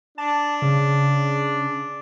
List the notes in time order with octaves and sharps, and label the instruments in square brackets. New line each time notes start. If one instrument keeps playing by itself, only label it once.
[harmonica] D4 [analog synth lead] A5
[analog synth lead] C#3